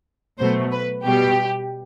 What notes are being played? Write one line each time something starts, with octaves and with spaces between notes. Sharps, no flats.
B2 F#3 A3 C5
B4
B2 G3 G4